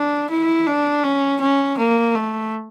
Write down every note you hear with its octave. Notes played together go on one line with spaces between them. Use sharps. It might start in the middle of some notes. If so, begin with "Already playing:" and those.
Already playing: D4
E4
D4
C#4
C#4
A#3
A3